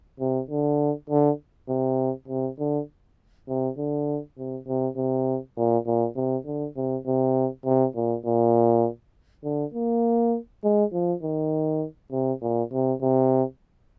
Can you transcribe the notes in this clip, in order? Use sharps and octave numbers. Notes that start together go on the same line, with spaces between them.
C3
D3
D3
C3
C3
D3
C3
D3
C3
C3
C3
A#2
A#2
C3
D3
C3
C3
C3
A#2
A#2
D3
A#3
G#3
F3
D#3
C3
A#2
C3
C3